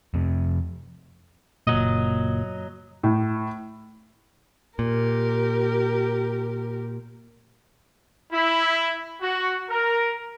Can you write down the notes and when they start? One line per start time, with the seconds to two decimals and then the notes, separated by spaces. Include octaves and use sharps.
0.14 F2 C3
1.67 F#1 A#2 F#3 D#5
3.03 A2
4.79 A#2 G4 A#4
8.32 E4
9.21 F#4
9.69 A#4